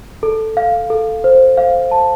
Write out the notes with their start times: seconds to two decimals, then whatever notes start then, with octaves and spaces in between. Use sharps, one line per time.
0.23 A4
0.57 F5
0.90 A4
1.24 C5
1.57 F5
1.91 A5